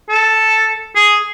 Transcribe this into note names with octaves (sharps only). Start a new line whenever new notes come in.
A4
G#4